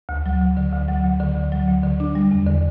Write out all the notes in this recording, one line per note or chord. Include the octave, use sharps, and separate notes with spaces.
D2
F#3
D2
D3
D2
F#3
D2
D3
D2
F#3
D2
D3
D4
G3
E2
D3